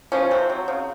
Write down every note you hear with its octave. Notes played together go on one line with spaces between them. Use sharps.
F3 C#4
C3 C4
F#3
C#3